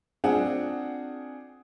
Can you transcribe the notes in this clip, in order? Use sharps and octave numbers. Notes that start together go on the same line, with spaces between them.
C4 D4 F4 G#4 F#5